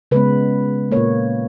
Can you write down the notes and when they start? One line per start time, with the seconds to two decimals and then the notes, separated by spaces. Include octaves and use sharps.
0.11 C#3 G#3 B3 B4
0.91 A#2 A#3 C#5